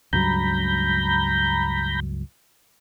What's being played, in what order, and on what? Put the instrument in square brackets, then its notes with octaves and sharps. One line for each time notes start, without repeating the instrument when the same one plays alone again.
[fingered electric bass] C#2 G2 F#3 [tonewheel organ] A#5 B5 G6